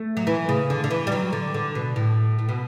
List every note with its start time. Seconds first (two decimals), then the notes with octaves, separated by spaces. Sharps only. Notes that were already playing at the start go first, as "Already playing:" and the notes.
Already playing: A3
0.17 F#3
0.27 E3
0.49 C#3
0.70 D3
0.84 D3
0.91 E3
1.07 G3
1.12 F#3
1.33 D3
1.54 D3
1.75 B2
1.96 A2
2.39 A2
2.49 B2